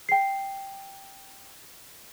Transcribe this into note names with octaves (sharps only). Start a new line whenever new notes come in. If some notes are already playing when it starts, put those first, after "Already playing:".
G5 C7